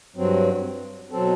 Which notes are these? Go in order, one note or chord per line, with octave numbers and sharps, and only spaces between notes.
G2 F#3 C4
B2 F#3 C4 A4